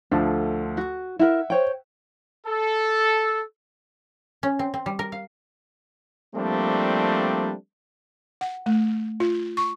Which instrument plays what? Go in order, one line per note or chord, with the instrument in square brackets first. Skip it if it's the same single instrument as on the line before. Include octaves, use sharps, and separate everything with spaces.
[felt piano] D2 F3 A3 [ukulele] D4
[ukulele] F#4
[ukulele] E4 A#4 [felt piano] E5 F#5
[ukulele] C5 C#5 G5
[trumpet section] A4
[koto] C#4
C4
C4
G3
A#4
F5
[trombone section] F3 G3 A3 A#3 C4 D4
[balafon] F#5
A3
F4
C#6